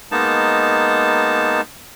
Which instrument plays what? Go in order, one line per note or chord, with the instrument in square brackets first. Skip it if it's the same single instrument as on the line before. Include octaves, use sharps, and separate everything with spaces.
[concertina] G#3 A#3 B3 D#4 A5